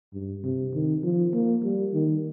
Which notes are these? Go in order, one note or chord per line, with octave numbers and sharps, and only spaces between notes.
G2
C3
D#3
F3
A#3
G3
D#3